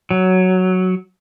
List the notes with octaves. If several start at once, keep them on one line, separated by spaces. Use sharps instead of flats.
F#3